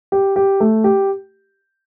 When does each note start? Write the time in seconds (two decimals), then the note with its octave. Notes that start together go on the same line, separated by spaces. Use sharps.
0.12 G4
0.36 G4
0.60 A3
0.84 G4